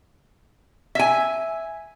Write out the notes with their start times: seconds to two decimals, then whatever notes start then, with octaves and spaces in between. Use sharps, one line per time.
0.95 E5 G#5